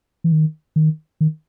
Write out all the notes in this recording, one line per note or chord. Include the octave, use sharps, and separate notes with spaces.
E3
D#3
D#3
D#3